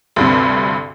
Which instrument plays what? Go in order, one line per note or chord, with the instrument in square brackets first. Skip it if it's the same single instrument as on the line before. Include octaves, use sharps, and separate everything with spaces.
[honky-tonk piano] D2 G2 C3